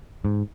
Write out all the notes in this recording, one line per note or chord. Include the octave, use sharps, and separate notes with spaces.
G#2